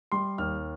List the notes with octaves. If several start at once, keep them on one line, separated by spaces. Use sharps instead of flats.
G3 C6
D#2 F6